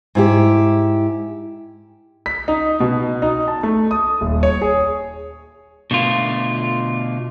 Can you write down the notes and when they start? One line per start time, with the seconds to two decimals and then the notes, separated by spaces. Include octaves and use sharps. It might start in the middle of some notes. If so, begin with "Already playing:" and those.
0.15 G#2 E4 G4
2.26 B6
2.48 D#4
2.80 B2
3.22 D#4
3.48 A5
3.63 A3
3.91 D#6
4.21 D#1
4.43 C#5
4.62 G#4
5.91 B2 D3 A3 F4